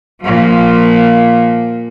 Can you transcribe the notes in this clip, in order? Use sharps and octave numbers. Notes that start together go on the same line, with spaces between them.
A#2 F3